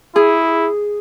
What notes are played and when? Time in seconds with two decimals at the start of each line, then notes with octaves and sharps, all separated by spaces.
0.16 E4 G#4